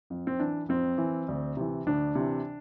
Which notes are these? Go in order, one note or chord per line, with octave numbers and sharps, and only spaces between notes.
F2
C4
E3 D4
F2 C4
E3
D2
C3 E3
D2 D4
C3 E3